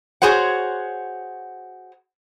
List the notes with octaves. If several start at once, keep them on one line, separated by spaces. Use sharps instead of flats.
F#4 G#4 C5 C#5 F#5